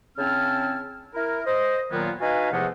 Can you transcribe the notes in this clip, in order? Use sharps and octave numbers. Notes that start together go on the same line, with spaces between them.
C#3 C4 C#4 E4 A5 F6
E4 A#4
C5 D#5
A#2 D#3 F#3 A#3 B3 F4
D#4 F#4 B4 F5 G#5
E2 C3 F3 G#3 A3 F#5